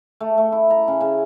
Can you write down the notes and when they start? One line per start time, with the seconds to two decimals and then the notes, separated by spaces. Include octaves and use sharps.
0.20 A3
0.38 A3
0.52 E4
0.70 A#5
0.88 C#3
1.01 C#3